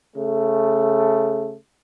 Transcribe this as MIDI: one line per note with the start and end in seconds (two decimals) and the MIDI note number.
0.16 1.55 49
0.16 1.55 57